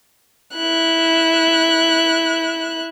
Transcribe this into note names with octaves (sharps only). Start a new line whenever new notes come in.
E4 F#6